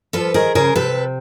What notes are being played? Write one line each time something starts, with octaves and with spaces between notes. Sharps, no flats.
F3 A4 B4
D#3 G#4 A#4
C#3 G#4 A#4
C3 A4 B4